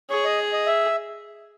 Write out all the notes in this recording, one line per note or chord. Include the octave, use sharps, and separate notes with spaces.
G#4 C#5
D#5
D#5
E5